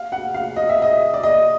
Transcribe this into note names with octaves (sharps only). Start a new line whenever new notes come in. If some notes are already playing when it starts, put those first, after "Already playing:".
Already playing: F5
F#5
F5
D#5
E5
D#5
D5
D#5